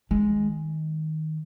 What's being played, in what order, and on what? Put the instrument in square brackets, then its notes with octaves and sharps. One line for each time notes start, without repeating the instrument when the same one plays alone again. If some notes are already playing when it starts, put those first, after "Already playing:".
[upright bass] D#3 [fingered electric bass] G#3